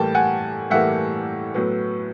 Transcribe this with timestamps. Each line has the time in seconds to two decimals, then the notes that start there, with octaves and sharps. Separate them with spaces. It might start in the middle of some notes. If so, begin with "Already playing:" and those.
Already playing: A2 E3 G3 A#3 G5 A5
0.15 F#5 G#5
0.70 A2 E3 G3 A#3 E5 F#5
1.54 A2 F#3 B3